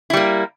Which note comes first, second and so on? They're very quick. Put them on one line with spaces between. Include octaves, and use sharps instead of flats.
E4 G3 A#3